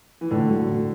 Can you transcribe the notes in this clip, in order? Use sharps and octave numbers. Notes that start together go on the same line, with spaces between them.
E3
A2 D3
F#3 A3
A2